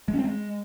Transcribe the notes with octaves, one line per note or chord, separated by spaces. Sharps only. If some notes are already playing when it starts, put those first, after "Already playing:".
G#3
C#4
C4
G#3